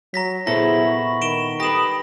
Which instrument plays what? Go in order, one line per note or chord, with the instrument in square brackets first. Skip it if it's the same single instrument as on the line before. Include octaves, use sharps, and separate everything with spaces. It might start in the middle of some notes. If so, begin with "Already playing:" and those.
[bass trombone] F#3 [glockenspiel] A#5 A#6 B6
[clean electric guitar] A#2 B3 A4 [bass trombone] E4 [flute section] G#4 C5 [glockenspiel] A#6
[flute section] B5 C#6
[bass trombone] D#3 [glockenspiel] D7 E7 G7
[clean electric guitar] G4 B4 [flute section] A4 D#6 [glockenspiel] A#6 E7